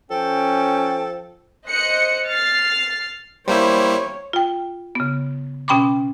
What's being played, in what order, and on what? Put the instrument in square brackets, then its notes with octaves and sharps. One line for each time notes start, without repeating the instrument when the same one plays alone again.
[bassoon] F3 [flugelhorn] C#4 [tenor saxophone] A4 [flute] G5
[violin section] C5 D#5 F#6 C#7
F6 A6 C7
[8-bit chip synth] G3 A#3 E4 [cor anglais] C5 [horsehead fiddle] C#5
[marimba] F4 G5
C#3 B3
B2 C#4 G5 B5 C6 D6